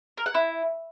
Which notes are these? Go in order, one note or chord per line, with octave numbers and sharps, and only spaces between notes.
A#4
F#5
E4